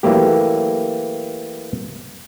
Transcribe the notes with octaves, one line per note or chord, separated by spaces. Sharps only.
E3 F#3 A3 A#3 G4